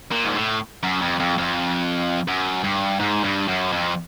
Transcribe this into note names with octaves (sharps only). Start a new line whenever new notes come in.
A#2
G#2
A2
F#2
F2
F2
F2
F#2
G2
G#2
G2
F#2
F2